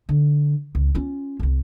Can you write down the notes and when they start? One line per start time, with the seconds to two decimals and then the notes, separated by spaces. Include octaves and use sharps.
0.09 D3
0.75 C#2
0.95 C#4 F4
1.40 E1 C2